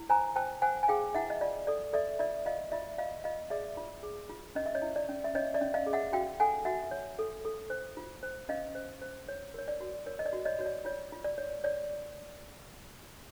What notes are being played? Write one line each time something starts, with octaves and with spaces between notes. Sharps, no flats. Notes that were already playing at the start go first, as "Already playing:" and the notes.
Already playing: E4
C5 G#5 A#5
C5 G5 A5
C5 F#5 G#5
G#5
G#4 F5 G5
E4 E5 F#5
D#5
F4 D5
A4 D5
A4 D5 E5
F4 D5 E5
F4 D#5 F5
F4 D5 E5
F4 D#5 F5
F4 D#5 F5
G#4 D5 E5
F4
G#4
F4
C#4 D#5
E5
C#5 D#5
E4
D5
C#4
E5
C#4 C#5 D#5
D5 E5
C#4
D#5 F5
G#4
E5 F#5
F#4 F5 G5
A4 F#5 G#5
F#4 E5 F#5
C#5
A4
A4
C5
F4
C5
C#4 D#5 F5
C5
C5
C#5
A#4 C#5
D5
F#4
A#4 C#5
D#5
D5
F#4
C#5 D#5
F#4 C#5
D5
F4 C#5
F4
D5
C#5
C#5 D5